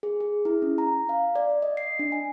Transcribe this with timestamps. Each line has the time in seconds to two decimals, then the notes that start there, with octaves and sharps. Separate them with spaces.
0.03 G#4
0.20 G#4
0.45 E4
0.62 C#4
0.78 A#5
1.09 F5
1.35 D5
1.62 D#5
1.77 C7
1.99 D4
2.12 G#5